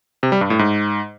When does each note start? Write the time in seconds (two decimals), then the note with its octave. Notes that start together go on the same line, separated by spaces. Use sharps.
0.23 C3
0.32 G3
0.41 G2
0.50 A2
0.59 G#2